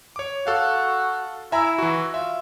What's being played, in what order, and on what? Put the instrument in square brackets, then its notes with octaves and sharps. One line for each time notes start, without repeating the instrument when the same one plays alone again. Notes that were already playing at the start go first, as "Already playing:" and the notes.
[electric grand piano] C#5 D6
[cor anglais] F#4 [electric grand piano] A4 F5
[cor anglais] E4 [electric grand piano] E5 G#5 A#5
[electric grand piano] E3 F#4
[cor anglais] F4 [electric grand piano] E5